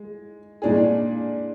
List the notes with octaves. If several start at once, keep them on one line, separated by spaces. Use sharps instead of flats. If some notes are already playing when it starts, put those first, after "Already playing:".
Already playing: G#3
A#2 G#3 D4 G#4